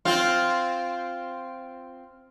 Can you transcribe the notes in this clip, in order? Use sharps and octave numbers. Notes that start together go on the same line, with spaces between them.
C4 F4